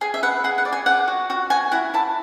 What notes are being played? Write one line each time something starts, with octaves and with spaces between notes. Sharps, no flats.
G#4 G#5
E5
B4 F#5
G#4 F#5
F#5
D5
G#5
D5 F#5
F#4
F#4 F#5
F#4 G#5
E4 F#5
E4 A5